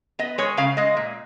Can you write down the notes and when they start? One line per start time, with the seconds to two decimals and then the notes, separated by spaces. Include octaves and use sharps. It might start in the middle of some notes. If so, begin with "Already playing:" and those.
0.19 B3 D#5
0.38 G#3 C#5
0.57 C#3 F5
0.77 G#3 D#5
0.97 A#2